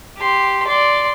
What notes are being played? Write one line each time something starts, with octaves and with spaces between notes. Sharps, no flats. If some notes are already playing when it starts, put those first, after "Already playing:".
G4 C6
D5 C6